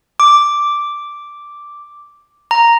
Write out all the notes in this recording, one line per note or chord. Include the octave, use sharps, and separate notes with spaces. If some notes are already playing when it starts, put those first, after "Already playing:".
D6
A#5